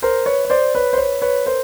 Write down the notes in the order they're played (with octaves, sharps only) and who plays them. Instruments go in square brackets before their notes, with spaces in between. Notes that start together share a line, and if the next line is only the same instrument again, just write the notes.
[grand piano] A#4 C5
B4 C#5
C#5
C5 D5
B4 C#5
C5
B4 C#5
B4 C#5
A#4 C5